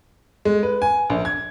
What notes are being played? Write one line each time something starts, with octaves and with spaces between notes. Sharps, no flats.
G#3
B4
G#5
A#1
G#6